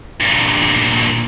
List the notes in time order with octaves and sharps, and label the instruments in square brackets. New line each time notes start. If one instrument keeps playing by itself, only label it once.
[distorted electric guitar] G2 A#2